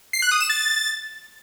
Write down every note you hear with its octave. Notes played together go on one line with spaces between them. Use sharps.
C7
F#6
D#6
E7
A6